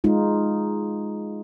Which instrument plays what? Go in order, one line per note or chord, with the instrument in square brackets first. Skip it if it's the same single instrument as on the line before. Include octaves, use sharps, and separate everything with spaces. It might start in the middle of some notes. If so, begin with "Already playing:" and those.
[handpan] G#3 D#4 F4